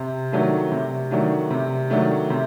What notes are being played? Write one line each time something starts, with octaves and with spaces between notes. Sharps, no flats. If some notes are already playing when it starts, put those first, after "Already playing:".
Already playing: C3
D#3 F#3 A3 D4
C3
D#3 F#3 A3 D4
C3
D#3 F#3 A3 D4
C3